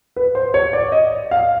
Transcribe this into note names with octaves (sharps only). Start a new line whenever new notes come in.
B4
C5
C#5
D5
D#5
F5